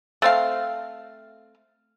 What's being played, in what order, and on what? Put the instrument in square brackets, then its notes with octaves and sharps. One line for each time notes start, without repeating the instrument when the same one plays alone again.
[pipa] A3 C4 F5